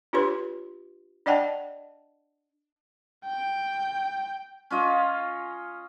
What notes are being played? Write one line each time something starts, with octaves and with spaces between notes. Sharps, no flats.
D4 F4 G4 B4 C#5 C6
D4 D5 D#5 F#5 G5 A5
G5
C#4 F4 D#5